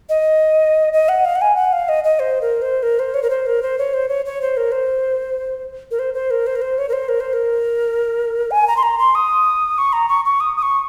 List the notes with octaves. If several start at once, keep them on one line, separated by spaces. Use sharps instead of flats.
D#5
D#5
F#5
F5
F#5
G#5
F#5
F5
D#5
D#5
C5
A#4
C5
A#4
C5
C#5
A#4
C5
A#4
C5
C#5
C5
C#5
C#5
C5
A#4
C5
A#4
C5
C5
A#4
C5
A#4
C5
C#5
A#4
C5
A#4
C5
A#4
G#5
A#5
C6
A#5
C6
D#6
C#6
A#5
C#6
C#6
D#6
D#6
C#6